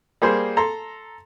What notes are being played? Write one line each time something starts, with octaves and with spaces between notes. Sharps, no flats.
G3 A#3 G#4 C5
A4 A#5 C6